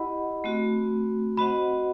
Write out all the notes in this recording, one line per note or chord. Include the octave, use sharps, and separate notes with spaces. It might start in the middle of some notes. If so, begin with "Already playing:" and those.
Already playing: E4 G4 D#5 F#5 B5
A3 C4 F#4
C4 F#4 C5 D#5 F#5 B5